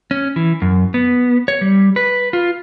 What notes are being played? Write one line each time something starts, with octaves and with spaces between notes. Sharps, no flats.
C#4
E3
F#2
B3
C#5
G3
B4
F4